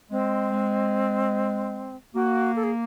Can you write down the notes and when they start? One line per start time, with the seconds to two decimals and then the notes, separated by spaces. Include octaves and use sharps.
0.11 G#3 C4
0.51 G#3
2.15 A#3 F#4
2.56 A4
2.63 G#4